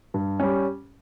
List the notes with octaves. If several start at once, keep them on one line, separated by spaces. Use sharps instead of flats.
G2
G3 C#4